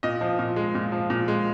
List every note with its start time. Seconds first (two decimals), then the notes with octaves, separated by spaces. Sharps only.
0.03 A#2 D#5
0.21 F3
0.39 A#2
0.56 G#3
0.75 A#2
0.92 F3
1.10 A#2
1.28 G#3